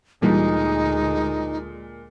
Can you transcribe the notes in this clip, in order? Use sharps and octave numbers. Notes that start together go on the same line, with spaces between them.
D2 A#2 E3 G3 G#3 A#3 D4 D#4